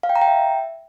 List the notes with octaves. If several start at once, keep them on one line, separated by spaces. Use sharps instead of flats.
F5
G5
A#5
G5
E5